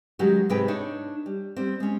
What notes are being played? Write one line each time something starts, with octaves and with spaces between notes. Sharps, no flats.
D#3 F#3 G#3 C#4 F#4 G4
G#2 C3 D#4 G#4 B4 G5
D4 D#4 C#5
G3
G3 C4
G#3 C#4